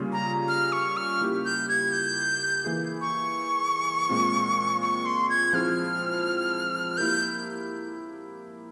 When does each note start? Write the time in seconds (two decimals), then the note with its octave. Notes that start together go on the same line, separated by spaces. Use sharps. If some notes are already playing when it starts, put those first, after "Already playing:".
Already playing: C#3 G3 A#3 C#4 F4
0.13 A#5
0.48 F6
0.72 C#6
0.97 F6
1.21 A#3 E4 G4
1.45 G6
1.69 G#6
1.92 G6
2.65 E3 A#3 E4 G#4
3.01 C#6
4.09 A#2 G#3 C4 F4
4.82 C#6
5.05 C6
5.29 G#6
5.53 F3 C4 E4 G#4 C5 F6
6.97 A#3 E4 G4 A#4 G6